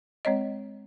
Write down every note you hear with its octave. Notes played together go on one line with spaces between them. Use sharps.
G#3 C4 C#5 D#5